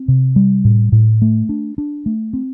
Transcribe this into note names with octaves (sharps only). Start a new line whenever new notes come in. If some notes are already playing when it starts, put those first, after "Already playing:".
Already playing: C4
C3
G3
A2
A2
A3
D4
D4
A3
C4